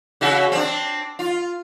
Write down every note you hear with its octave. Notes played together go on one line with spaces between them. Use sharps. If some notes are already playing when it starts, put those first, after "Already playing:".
C#3 F#4 E5
C4 D4
F4